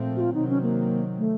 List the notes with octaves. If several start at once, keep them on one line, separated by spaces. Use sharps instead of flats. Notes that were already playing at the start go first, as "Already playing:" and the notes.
Already playing: A#2 F3 A3 C4
F#4
F4
C3 D#3 F#3 C4 D#4
C#4
A#3
A3